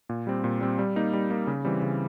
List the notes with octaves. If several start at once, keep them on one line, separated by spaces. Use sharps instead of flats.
A#2
G3 C4
A#2
G3 C4
G3
A#3 D#4
G3
A#3 D#4
C#3
E3 G3 C4
C#3